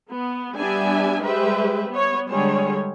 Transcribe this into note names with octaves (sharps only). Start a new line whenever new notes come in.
B3
G3 B3 D4 G4 E5 G#5
G3 G#3 G4 B4 C5 E5
B3 C#5
D3 G3 G#3 G#4 C#5